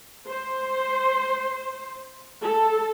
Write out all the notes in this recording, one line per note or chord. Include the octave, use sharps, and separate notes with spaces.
C5
A4